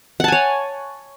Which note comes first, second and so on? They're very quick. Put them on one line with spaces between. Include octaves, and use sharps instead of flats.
F#5 A5 G#5 C#5